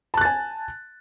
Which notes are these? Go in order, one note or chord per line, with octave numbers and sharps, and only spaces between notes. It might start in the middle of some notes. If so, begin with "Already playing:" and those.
G#5 A5 F#6 A6